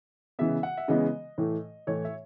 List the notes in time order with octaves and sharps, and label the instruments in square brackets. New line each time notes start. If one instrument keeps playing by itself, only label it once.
[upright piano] C#3 E3 G#3 B3 E5
F#5
E5
C#3 E3 G#3 B3 D#5
A2 E3 A3
A2 E3 A3 C#5
E5